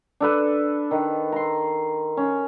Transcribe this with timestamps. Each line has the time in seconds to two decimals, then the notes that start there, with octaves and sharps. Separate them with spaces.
0.20 D4 A4 B4
0.91 D#3
1.32 A#5 C6
2.17 C#4